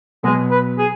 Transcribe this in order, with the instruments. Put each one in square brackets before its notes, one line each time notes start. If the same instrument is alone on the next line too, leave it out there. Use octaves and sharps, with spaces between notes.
[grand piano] B2 F#3 B3 [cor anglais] G#3
[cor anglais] B4
G#4